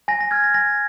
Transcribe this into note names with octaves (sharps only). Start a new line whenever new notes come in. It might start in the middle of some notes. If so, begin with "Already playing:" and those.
G#5 A#6
A#6
F6 G#6
A#6
G#5 A#6